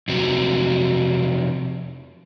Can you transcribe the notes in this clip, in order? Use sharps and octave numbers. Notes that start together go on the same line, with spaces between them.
F2 C3 F#3